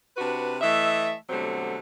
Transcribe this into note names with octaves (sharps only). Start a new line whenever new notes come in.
C3 D4 F#4 B4
E3 A3 D#5 E5
B2 D3 F#3 G3 A3 C4